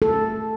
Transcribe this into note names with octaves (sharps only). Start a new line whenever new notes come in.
A4